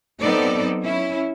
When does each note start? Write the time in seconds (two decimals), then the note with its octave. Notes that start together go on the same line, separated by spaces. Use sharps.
0.20 F#3 B3 C4 D#4 A4 D5
0.84 C#4 E4